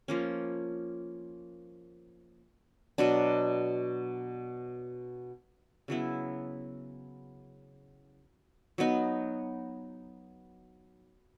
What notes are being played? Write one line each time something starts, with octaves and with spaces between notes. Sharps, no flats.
F3 A#3 C#4
B2 F#3 B3 D4
C#3 F#3 B3 E4
F#3 B3 D#4